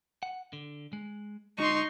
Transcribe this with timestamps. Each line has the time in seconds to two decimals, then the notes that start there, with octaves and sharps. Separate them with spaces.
0.23 F#5
0.53 D3
0.93 G#3
1.58 D3 G#3 D#4 C6 C#6